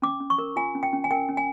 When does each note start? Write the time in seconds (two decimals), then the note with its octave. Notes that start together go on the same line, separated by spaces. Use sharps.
0.02 C#4 D6
0.20 C#4
0.30 C#6
0.38 A#4
0.56 F4 G#5
0.75 C#4
0.83 G5
0.93 C#4
1.04 G#5
1.11 A#4 G5
1.29 C#4
1.37 G#5